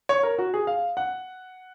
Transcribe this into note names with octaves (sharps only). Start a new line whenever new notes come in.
C#5
A#4
F#4
G#4
F5
F#5